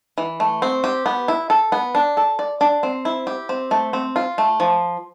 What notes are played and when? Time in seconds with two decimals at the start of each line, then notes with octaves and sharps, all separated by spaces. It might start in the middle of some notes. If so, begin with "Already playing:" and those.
0.18 E3
0.40 A3
0.62 C4
0.84 G4
1.06 B3
1.28 E4
1.50 A4
1.72 B3
1.95 D4
2.17 A4
2.39 D5
2.61 D4
2.83 C4
3.05 E4
3.27 G4
3.49 C4
3.71 A3
3.93 C4
4.16 F4
4.38 A3
4.60 F3